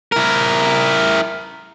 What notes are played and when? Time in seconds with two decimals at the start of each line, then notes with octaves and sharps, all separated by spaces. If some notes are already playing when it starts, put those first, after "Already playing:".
0.12 E4 A#4